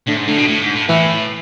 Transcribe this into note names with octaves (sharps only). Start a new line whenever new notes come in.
A2 D3
G#2
A2 D3
B2
A2
G#2
A2
A2 E3